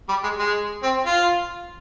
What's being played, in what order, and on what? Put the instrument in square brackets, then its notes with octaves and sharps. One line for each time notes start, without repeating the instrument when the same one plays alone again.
[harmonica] G3
G#3
G#3
C4
F4